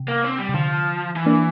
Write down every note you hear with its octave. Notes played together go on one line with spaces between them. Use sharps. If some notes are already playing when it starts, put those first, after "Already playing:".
Already playing: C3
A#3
C4
G3
C3
D3 F3
E3
A#3 D4